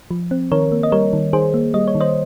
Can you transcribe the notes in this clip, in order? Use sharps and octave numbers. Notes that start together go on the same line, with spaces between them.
F3
C4
D#3 A#4 C#5
A#3
D#5
G3 A#4 C#5
D#3
D#3 G#4 C5
A#3
G3 D#5
C#5
D#3
C5 D#5